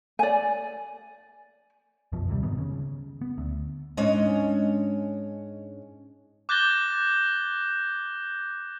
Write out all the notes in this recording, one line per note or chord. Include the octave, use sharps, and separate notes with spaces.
D5 G#5
B1 F#2 B2 F3
D2 C3 D#3 G3
F1 G#2 D#3 B3
C#3
B3
D2
G#2 G#3 C#4 D4 C#5 D#5
D6 F#6 G6 A6 A#6 G7